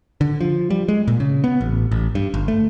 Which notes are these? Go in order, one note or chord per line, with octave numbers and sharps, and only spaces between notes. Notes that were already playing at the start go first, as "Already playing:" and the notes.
D3
F3
G3
G#3
A#2
C#3
B3
A1
A1
G2
G1
A3